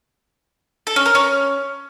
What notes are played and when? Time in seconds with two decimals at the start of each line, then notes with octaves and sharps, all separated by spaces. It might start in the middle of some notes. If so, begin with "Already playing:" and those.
0.87 A4
0.96 C#4
1.06 A#4
1.15 C#4